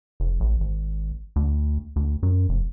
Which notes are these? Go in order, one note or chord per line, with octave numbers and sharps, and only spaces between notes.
F1
A1
G#1
D2
D2
F#2
F1